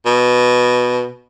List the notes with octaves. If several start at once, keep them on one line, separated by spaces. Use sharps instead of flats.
B2